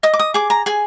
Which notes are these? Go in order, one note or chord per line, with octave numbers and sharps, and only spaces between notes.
D#5 D#6
D6
D#6
G#4 D6
A#5
G#4 G#5